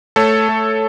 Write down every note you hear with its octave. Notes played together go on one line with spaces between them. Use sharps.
A3 A4 C#5
A3